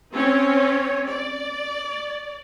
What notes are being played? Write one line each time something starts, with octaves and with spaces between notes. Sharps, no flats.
C4 C#4 C#5
D5